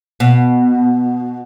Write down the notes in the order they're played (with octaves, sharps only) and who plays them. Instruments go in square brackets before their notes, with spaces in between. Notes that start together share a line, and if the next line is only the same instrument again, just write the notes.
[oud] B2